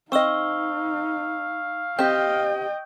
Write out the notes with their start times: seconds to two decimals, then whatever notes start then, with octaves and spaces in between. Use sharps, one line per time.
0.12 C4 D#4 D#5 F5 C#6 E6 G7
1.99 C4 G4 D#5 G5 G6